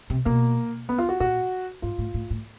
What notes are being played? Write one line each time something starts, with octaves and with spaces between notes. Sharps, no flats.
C3
B2 A#3
B3
F4
F#4
A#2 F#4
G#2 F4
A2
A2
A2